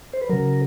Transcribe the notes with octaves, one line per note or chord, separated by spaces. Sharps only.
C5
B4
C#3 F#3 A#4